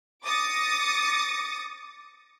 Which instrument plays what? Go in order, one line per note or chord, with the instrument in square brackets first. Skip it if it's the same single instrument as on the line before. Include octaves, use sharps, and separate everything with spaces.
[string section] D6 D#6 A6 A#6 C#7